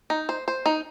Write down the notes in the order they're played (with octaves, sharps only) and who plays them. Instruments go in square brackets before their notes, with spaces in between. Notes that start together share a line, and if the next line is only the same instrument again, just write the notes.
[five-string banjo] D#4
C5
C5
D#4